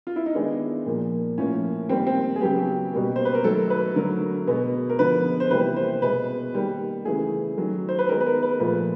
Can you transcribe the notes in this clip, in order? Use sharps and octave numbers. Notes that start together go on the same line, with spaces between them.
F4
E4
D#4
D#3 G#3 B3 D4
A#2 F3 A#3
A2 F3 A#3 C#4
D#3 G3 A#3 C4
C4
G#4
C#3 F#3 B3 G4
B2 G3 A#3
C5
B4
A#4
D#3 F#3 A3 A4
B4
D3 F#3 A3 A#4
B2 G#3 B3
A#4
D3 F3 G#3 B3 B4
C5
C3 E3 G3 A#3 B4
C5
B2 G#3 B3 B4
D#3 G3 A#3
C#3 E3 A3 G#4
D#3 F#3 A3
C5
B4
D#3 G#3 B3 A#4
B4
A#4
B4
A#2 F3 A3 B4